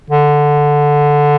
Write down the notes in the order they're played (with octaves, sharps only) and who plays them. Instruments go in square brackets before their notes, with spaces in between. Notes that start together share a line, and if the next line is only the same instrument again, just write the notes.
[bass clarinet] D3